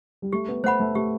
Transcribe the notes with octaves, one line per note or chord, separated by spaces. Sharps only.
G3
A3 G4
B3
A3 C5 F#5 B5
A3
A3 G4